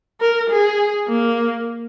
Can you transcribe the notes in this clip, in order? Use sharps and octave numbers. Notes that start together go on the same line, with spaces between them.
A#4
G#4
A#3